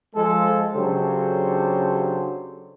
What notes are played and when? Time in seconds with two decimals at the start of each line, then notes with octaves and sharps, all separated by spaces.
0.15 F3 G#3 A4
0.74 C#3 F#3 D4 G4 A4 C5